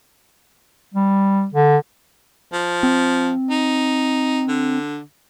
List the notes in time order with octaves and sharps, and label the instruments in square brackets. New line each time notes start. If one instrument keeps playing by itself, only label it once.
[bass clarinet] G3
D3
[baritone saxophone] F3
[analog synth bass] C4
[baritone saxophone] D#4
D3